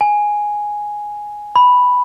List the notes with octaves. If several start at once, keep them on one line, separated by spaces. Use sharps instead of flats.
G#5
B5